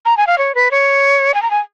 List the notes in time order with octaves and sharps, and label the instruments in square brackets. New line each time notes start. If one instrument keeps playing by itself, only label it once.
[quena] A#5
G#5
F5
C#5
B4
C#5
G#5
A#5
G#5